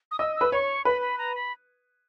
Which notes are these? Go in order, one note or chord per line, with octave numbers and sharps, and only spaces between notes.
D#6
D#5 E6
E6
B4
C#5 C#6
B4 B5
B5
A#5
B5